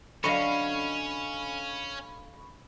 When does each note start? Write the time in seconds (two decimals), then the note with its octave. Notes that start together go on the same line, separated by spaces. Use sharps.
0.24 D3 F#3 C#4 A4 D#5 F5 B5 C#6